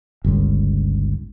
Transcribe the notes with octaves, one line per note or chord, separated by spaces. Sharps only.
G1 C#2